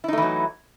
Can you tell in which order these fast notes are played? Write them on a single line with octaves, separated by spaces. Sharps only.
E4 D#4 A3 E3 F#3